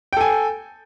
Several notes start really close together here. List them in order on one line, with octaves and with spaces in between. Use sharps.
G5 A4 G#5